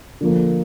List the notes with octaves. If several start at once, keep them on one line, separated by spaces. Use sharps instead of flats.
D3 F3 A#3